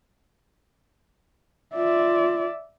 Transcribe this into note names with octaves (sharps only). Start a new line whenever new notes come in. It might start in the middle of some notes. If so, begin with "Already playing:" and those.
F4 D5 E5